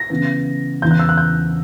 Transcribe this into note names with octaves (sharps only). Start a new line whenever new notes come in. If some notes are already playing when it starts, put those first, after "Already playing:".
Already playing: A#6
C#3 E3 B3
E2 C#3 E3 B3 G6
F#6
E6
F#6
G6